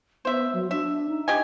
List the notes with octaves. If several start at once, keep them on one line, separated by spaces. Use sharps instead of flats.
B3 C5 E5
F#3
D4 E5
D#4
G4 D#5 G#5